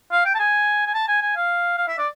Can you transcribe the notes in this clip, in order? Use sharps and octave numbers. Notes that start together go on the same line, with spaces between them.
F5
G5
A5
G#5
G#5
A5
G#5
G#5
F5
F5
E5
D5